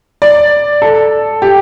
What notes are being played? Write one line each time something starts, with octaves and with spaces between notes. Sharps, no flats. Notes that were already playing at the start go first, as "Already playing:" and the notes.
D5
A4
G4